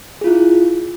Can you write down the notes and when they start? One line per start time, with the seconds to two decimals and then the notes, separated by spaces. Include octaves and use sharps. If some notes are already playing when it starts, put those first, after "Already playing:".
0.21 G#4
0.24 F4
0.27 E4